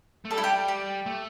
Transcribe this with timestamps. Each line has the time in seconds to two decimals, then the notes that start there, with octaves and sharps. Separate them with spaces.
0.25 A3
0.31 G3 A4
0.38 E4
0.44 G4
0.68 G4
1.06 A3